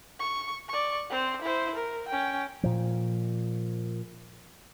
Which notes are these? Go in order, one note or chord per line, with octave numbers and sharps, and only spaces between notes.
C#6
D5 C#6
C4 C5
E4 C5
A#4
C#4 G5
A#2 F3